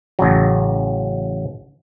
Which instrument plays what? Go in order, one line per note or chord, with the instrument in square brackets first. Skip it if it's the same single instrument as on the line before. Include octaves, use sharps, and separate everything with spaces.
[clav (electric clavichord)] A1 C#3 F#3